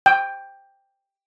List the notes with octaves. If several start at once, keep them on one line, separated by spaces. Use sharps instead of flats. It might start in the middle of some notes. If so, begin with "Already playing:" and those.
G5